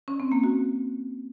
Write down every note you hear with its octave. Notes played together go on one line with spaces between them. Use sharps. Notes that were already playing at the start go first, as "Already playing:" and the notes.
C#4
C4
A#3
F#4